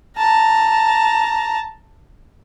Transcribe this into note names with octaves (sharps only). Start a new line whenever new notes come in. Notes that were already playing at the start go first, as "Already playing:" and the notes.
A5 A#5